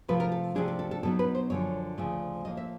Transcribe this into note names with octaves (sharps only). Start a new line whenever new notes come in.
C3 F3 A3 B4
A#4
A4
C3 F3 A3 D4 G#4
A4
A4
A4
B2 F#3 B3 D#4 A4
B4
C5
F#2 D3 F3 C#5
D2 C#3 F3 A3
A2 F3 A#3 D#5
E5